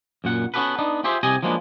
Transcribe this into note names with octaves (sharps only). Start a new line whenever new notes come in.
F#2 A#2 F#5
B3 C#4 F#4 G4 A4 B4
B3 D4 D#4
F4 G4 G#4 C5 E5
C2 C3 G4 G#4 D#5 G#5
F3 F#3 G#3 A#3 B3 D4